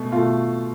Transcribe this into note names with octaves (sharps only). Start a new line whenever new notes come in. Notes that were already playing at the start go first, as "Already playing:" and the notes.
Already playing: B2 A3
B2 A3 F4